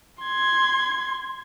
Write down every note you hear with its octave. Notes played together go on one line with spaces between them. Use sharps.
C6 G#6